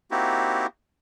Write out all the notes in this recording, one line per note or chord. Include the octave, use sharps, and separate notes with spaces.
A#3 C4 D#4 E4 F#4 G4